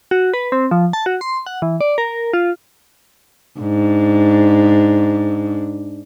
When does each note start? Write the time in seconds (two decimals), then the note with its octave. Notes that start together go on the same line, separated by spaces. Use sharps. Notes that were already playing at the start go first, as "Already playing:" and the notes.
0.11 F#4
0.34 B4
0.52 C4
0.71 F3
0.93 A5
1.06 F#4
1.21 C6
1.46 F#5
1.62 E3
1.81 D5
1.98 A#4
2.33 F4
3.60 G#2 D4